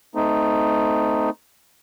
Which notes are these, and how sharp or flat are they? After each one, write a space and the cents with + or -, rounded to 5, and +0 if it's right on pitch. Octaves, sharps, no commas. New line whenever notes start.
A3 +0 C4 -30 D#4 +0